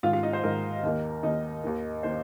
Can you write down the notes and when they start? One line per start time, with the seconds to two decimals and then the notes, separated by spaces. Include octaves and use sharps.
0.03 G#2 D#3 G#3 F4 F5
0.13 F4 F5
0.23 D#4 D#5
0.33 C5
0.43 G#2 D#3 G#3 A#4
0.83 D#2 D#3 A#3
1.23 D#2 D#3 A#3 D#4 D#5
1.63 D#2 D#3 A#3
2.03 D#3 A#3 C5